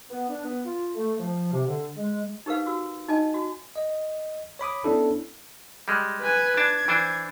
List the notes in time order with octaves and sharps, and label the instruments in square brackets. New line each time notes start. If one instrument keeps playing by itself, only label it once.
[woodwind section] B3
D4
B3
F4
A3
F3
C3
D3
G#3
[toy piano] D#4 G4 A#4 B4 F5
F#4 E6
D#4 D#5 G#5 A5
F#4
[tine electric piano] D#5
C#5 B5 D6 D#6
B3 C#4 D4 E4 A4
[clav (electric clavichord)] G3 G#3
[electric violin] B4 G#5
[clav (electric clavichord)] D4 A5 [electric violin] G#6
[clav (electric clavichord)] E3 D4 C5